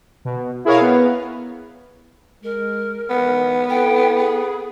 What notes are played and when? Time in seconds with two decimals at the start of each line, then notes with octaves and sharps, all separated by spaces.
0.25 B2
0.65 E4 G#4 A#4 C#5 F5
0.81 B3
2.43 G#3 A#4
3.10 E2 G#2 B3
3.70 C4 E4 A4 G5
4.17 G#4